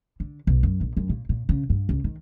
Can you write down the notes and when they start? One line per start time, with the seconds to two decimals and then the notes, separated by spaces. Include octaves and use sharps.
0.20 D3
0.47 B1
0.63 F#2
0.81 A#1
0.97 F#2
1.09 A#2
1.29 A#2
1.49 C#3
1.70 G2
1.89 C#2
2.04 D#3